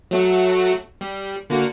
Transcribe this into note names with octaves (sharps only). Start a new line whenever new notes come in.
F#3 A3 F#4
G3
D3 A#3 F#4